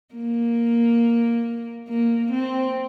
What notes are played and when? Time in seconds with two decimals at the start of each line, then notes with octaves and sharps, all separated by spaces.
0.15 A#3
1.88 A#3
2.31 C4